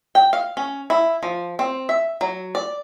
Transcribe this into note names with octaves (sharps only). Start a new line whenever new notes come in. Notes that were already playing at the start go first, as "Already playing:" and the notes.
G5
F5
C#4
E4
F3
C4
E5
F#3
D5